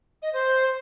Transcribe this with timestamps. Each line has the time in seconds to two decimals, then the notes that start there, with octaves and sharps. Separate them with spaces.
0.22 D#5
0.33 C5